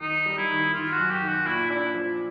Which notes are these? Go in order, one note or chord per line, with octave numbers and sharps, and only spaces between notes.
D#3 D#4
G3
E4
D#3
D#3 F4
F#4
F#2
G4
D#3
F#4
A#2 E4
D4 E4
F3